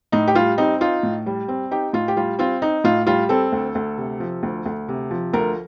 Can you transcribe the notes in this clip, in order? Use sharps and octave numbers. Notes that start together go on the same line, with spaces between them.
A2 D#4
G4
G3 F4
C4 D#4
D#4 F4
A2
G3
C4
D#4 G4
A2 F4
G4
G3 F4
C4 F4
D#4
A2 F4
G3 F4
C4 A4
D2
D2
C3
F3
D2
D2
C3
F3
D2 A#4